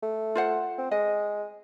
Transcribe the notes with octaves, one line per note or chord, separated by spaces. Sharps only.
A3
F4 C5 F#5
C4
G#3 D#5